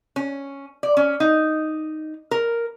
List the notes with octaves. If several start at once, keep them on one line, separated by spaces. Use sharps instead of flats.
C#4
D5
C#4
D#4
A#4